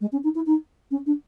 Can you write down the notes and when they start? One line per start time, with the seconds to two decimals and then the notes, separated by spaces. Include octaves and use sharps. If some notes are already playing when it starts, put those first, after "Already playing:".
0.01 G#3
0.12 C#4
0.23 D#4
0.35 E4
0.46 D#4
0.91 C#4
1.06 D4